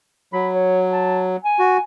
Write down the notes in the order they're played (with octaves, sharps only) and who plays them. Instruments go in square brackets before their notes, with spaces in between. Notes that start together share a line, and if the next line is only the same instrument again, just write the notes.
[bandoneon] F#3 [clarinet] B5
[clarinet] C#5
A5
G#5
[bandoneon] F#4